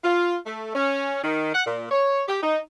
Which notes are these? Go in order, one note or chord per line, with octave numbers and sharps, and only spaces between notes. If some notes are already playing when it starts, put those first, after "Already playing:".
F4
A3
C#4
D#3
F#5
A#2
C#5
G4
D#4